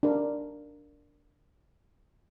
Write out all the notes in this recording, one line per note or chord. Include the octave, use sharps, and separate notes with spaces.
D4 A#4